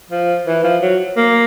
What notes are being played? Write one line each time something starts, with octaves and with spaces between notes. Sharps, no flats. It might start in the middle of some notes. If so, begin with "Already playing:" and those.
F3
E3
F3
F#3
A#3